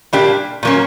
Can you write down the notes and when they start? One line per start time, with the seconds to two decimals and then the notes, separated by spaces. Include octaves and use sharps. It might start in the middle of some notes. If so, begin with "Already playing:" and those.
0.13 A#2 G3 A#3 D4 G4
0.63 A#2 F#3 A#3 C#4